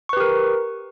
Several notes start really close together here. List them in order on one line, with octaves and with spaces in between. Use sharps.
C#6 B4 G4 A#4